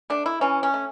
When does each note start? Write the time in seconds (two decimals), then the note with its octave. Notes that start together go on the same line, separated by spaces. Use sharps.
0.10 A3 D4
0.26 E4
0.41 E3 C#4
0.63 C#4
0.74 A3